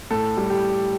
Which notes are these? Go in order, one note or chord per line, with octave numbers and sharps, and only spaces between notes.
A2 A4
G3
G4